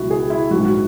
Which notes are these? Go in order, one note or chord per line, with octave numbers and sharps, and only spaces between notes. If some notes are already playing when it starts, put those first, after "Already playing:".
Already playing: C#2 B2 F#3 E4 F#4
G#4
E4
A#1 G#2 F#3 F#4
F#4